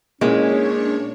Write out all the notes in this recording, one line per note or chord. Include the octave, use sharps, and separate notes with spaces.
A#2 G#3 C#4 D4 E4 C#5